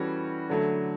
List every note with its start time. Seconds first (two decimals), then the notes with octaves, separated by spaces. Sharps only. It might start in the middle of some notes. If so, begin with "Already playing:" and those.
Already playing: E3 G3 C#4 F#4 A4
0.50 D3 F#3 A3